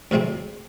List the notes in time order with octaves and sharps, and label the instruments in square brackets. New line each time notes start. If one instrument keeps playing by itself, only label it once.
[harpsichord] D2 C3 F3 G#3 C4